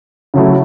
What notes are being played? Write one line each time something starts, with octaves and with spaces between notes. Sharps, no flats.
C#3 F#3 A3 E4